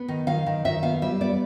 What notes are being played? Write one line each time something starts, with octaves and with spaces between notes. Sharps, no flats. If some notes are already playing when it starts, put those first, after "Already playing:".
Already playing: B3
D#3
D#3 F5
D#3
D#3 E5
B3 F5
G3 E5
B3 D5